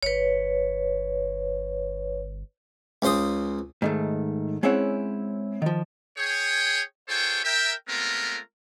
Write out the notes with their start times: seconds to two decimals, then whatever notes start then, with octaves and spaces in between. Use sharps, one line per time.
0.03 G1 B4 C#5
3.02 C#2 C#3 C5 C6 D#6
3.82 G#2 D#3 A3
4.63 G#3 C4 C#4 E4 C#5 F#5
5.62 D#3 F3
6.17 G#4 C#5 G5
7.07 F4 G#4 A4 C5 C#5 G5
7.44 A#4 E5 G5
7.88 G#3 A3 B3 C4 F4 A#4